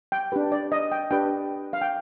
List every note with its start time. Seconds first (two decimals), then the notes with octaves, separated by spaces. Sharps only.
0.12 G5
0.32 D4 G4 B4
0.52 D5
0.72 D#5
0.92 G5
1.11 D4 G4 B4 G5
1.73 F5
1.81 G5